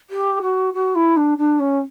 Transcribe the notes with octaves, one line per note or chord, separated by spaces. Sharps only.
G4
F#4
F#4
E4
D4
D4
C#4